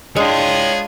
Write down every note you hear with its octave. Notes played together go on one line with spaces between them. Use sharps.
G#3 B3 D4 F4 G#4 C#5 G5